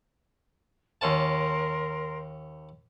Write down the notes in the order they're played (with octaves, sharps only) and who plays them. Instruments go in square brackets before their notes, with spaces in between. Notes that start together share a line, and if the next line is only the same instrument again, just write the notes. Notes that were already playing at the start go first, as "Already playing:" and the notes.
[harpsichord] D#2 C#4 A5 [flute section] A#4 C6